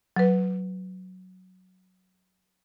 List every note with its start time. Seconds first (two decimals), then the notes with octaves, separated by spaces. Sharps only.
0.16 F#3 B4